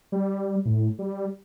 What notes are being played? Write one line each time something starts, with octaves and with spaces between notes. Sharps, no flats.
G3
A2
G3